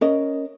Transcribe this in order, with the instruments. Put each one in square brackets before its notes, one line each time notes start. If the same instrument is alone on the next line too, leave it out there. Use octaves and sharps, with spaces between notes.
[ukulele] C#4 A#4 D#5